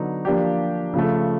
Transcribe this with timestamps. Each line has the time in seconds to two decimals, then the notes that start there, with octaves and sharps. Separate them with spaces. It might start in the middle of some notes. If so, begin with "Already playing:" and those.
Already playing: D3 F#3 B3 D#4
0.25 F3 A#3 D4 G4
0.94 C#3 F3 A3